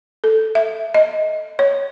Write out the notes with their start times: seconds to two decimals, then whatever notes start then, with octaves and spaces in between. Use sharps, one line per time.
0.24 A4
0.55 E5
0.94 D#5
1.59 C#5